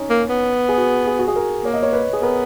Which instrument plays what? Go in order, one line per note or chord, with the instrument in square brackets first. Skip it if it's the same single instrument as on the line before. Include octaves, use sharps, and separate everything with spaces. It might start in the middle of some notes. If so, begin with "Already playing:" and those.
Already playing: [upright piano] C#4 D#4
[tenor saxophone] A#3
B3
[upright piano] G#4
F#4
G#4
F#4
G#4
A#4
[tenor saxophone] A#3 [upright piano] C#5
[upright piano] D#5
C#5
B4
G#4
[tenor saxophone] B3 [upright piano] A#4